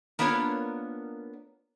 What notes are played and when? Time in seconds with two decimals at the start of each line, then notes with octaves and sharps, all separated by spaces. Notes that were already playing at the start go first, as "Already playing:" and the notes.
0.19 A#3 B3 D4 F4 A#4 C#5